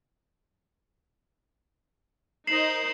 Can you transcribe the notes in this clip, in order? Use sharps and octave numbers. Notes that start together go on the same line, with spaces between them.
D#4 A#4 C5 C7 E7 F#7